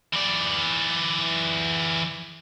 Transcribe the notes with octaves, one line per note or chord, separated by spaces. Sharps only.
E3 D5